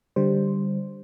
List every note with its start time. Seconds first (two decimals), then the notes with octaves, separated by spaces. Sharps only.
0.16 D3 G3 C5